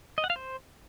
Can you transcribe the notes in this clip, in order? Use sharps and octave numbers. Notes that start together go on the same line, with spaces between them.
D#5
F#5
F5
C5